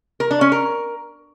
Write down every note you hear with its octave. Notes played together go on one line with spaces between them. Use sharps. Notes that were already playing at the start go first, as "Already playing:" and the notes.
A#4
D4
C#4
A#4